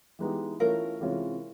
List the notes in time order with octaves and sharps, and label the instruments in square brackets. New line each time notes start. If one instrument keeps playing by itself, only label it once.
[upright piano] E3 G#3 B3 D#4 G4
[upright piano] E3 A3 C#4 F4 [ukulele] A#4
[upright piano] C3 E3 G#3 C#4 F4